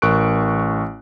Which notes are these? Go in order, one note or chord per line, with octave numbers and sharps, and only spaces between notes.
A1 A#4 C#6 F#6 D7